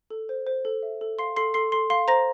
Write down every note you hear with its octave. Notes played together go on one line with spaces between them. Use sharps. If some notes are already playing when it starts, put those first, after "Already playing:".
A4
C5
C5
A4
E5
A4
F5 C6 C7
A4 C6 C7
A4 C6 C7
A4 C6 C7
F5 C6 C7
C5 A#5 A#6